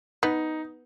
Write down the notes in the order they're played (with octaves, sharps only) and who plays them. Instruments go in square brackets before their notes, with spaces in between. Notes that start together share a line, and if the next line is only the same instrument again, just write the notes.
[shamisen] B3 [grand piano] D#4